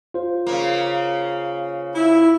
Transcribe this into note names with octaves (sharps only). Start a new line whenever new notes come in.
F4 C5
C#3 A#3
E4